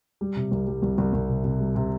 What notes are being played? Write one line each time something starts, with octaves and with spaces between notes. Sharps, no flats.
G3
C3
C2
G3
C2
C2
C2
C3
C3
G3
C3